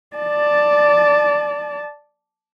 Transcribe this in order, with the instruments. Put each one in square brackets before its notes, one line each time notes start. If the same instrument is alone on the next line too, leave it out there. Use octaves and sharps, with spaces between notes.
[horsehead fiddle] D5 A5